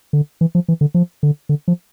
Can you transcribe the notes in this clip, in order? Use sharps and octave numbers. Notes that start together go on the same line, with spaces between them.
D3
E3
F3
E3
D3
F3
D3
D3
F3